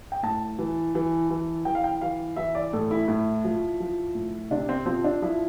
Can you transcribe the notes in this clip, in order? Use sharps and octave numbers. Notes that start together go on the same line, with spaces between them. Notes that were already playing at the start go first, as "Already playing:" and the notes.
G5
A2 A5
E3
E3
E3
E3 G5
F5
G5
E3 F5
E3 E5
D5
A2 A4
E4
A2 E4
F3
F3
A2
C3 D4
C4
F3 C4
D4
F3 E4